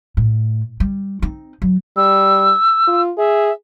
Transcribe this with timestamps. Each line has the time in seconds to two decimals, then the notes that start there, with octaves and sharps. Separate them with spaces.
0.17 A2
0.80 G3
1.22 C4 D#4
1.62 F#3
1.97 G3 E6
2.88 F4
3.18 G#4 E5